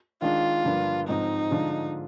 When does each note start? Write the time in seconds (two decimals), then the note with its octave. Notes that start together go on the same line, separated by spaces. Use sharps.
0.22 D#3 G#3 D4 F4
0.64 G2 D3 F3 A#3 D4
1.08 G#2 F3 C4 D#4
1.51 D3 F3 G#3 D4 F4